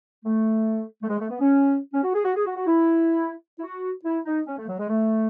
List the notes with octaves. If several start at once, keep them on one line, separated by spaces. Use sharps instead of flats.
A3
A3
G#3
A3
B3
C#4
C#4
F#4
G#4
F#4
G#4
F#4
F#4
E4
E4
F#4
E4
D#4
C#4
A3
F#3
G#3
A3